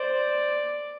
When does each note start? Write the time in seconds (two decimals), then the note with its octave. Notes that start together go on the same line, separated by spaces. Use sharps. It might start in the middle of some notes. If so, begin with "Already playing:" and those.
Already playing: C5 D5